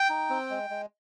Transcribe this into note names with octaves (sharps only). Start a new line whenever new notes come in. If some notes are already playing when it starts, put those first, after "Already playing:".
Already playing: G5
D#4
C4
G#3
G#3